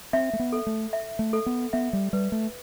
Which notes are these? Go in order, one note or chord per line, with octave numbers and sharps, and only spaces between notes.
C4 E5
A3
B3
A4
A3
E5
A3
A4
B3
B3 E5
G3
G3 B4
A3